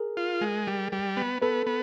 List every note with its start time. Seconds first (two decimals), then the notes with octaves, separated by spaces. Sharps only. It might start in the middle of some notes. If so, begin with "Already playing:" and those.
Already playing: G#4 A#4
0.17 F4
0.41 G#3
0.67 G3
0.92 G3
1.17 B3
1.42 B3 A4 B4
1.67 B3